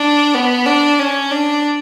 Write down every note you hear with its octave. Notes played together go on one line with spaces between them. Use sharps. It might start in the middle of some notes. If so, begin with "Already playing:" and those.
Already playing: D4
B3
D4
C#4
D4